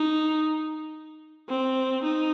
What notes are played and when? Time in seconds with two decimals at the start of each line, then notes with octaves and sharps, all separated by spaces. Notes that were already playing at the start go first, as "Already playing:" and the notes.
Already playing: D#4
1.49 C4
2.03 D#4